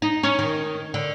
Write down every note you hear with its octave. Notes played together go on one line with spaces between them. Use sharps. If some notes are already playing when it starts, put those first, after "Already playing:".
D#4
C#4
D#3
D3